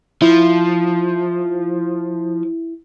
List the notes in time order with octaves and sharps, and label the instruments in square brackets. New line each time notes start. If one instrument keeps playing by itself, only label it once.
[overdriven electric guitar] F3 [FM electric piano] E4